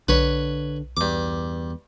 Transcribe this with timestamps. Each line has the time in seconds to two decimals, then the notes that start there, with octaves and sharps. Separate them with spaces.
0.08 B1 D3 B4 C#5
0.97 E2 G2 D6